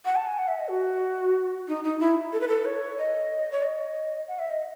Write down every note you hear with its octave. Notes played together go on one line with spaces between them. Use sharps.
F#5
A5
G#5
F#5
E5
D#5
F#4
D#4
D#4
E4
A4
B4
A4
C#5
D#5
C#5
D#5
F#5
E5
D#5